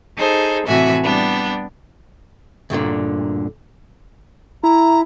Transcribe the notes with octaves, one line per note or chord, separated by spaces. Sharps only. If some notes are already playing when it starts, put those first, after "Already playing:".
D#4 G#4 A4 C5
A2 C3 E3 F#4 E5 G#5
G3 B3 D4
D2 G2 A#2 D3
E4 A#5